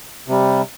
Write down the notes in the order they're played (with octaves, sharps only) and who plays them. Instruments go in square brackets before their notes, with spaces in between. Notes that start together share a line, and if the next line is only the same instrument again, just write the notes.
[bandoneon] C3 G3